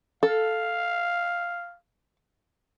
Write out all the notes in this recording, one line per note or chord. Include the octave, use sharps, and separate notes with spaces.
A4 F5